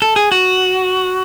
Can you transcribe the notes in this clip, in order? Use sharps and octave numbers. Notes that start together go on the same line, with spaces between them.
A4
G#4
F#4